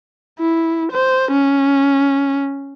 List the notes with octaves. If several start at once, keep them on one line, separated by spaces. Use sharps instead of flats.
E4
C5
C#4